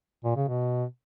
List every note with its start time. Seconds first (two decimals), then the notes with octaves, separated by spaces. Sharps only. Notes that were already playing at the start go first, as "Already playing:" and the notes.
0.24 A#2
0.36 C#3
0.48 B2